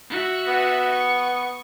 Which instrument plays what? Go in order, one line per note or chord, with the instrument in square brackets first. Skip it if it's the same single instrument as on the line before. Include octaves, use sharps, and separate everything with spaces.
[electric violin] F#4 E5
[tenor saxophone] B3
[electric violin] C#6